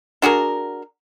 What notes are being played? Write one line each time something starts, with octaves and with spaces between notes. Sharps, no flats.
D4 F#4 G#4 A#4